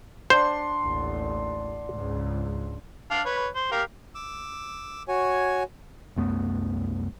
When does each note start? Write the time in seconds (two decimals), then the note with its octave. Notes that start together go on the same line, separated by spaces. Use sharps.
0.30 D4 C5 F#5 C6
0.80 A1 D#2
1.92 C#2 G#2
3.11 D4 F5
3.26 B4 C#5
3.55 C5
3.72 G4 A#4 F5
4.15 D6 E6
5.08 F#4 C#5 G#5
6.16 C2 F#2 A3 B3